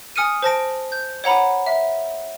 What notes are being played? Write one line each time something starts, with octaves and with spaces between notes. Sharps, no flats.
G#5 D#6 F6 C#7 D#7
C5 A5 A#6 D7
G6
C#5 F#5 A#5 B5
E5